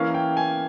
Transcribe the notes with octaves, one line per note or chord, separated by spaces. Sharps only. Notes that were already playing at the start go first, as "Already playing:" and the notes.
Already playing: E3 A#3 C#4 F5
G5
G#5